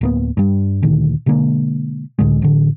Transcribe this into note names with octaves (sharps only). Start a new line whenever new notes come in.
D1 A#3 B3
G2 G3
D2 A#2 D#3
B2 D3 G#3 A#3
C#2 A2 D3 G#3
A1 D3